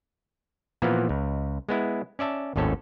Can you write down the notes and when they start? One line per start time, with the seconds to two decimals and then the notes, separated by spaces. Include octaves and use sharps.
0.82 A#2 E3 F3 A#3 B3
1.09 C#2
1.69 G#3 B3 E4
2.19 C#4 D5 E5 A5
2.56 G#1 D#2 A2 C#4 A4